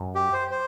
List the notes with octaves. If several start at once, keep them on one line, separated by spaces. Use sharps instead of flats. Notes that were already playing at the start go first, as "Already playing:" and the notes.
Already playing: F#2
G4
C5
C5